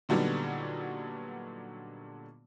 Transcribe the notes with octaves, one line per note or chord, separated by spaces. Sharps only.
A#2 D3 F#3 G3 B3 D#4